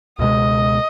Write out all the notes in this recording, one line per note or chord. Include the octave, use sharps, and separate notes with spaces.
C#2 B2 G#3 D#5